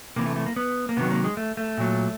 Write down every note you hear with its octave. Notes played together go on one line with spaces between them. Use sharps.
C3 E3 A#3
A3
A3
A#3
B3
A#3
C3 D#3 F#3 B3
A#3
G#3
A3
A3
A#2 F#3